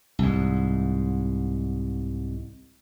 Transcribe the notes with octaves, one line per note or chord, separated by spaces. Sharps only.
C2 G#2